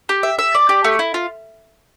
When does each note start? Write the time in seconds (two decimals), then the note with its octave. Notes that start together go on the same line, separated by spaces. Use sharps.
0.09 G4
0.23 E5
0.39 E5
0.55 D5
0.69 G4
0.84 A3
0.99 E4
1.14 F4